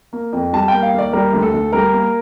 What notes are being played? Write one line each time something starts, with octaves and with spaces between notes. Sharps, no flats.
A#3
F2
G3 A5
A#3 G5
F5
D#2 D5
G3 A#4
D2
A4
D2
G3 A#4
A#3